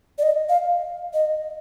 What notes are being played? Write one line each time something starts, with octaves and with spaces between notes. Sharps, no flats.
D5
D#5
F5
D#5